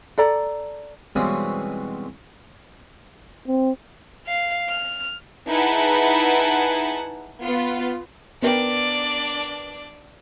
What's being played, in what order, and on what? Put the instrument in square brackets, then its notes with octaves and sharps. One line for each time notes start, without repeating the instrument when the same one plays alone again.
[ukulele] A4 D5 A#5
[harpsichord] B2 E3 G3 G#3 C4 C#4
[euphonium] C4
[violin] F5
F6
[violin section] D#4 E4 G#4 B4 F#5 A5
B3 F4
[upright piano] B3 A#4 G5 [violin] D4 D5